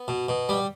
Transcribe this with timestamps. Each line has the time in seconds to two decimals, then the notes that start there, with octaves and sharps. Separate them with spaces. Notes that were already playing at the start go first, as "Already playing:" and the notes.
Already playing: B3
0.08 B2
0.29 B2
0.49 G3